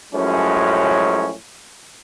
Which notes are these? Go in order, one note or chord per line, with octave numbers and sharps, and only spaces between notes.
F#2 A2 F3 F#3 G#3 C#4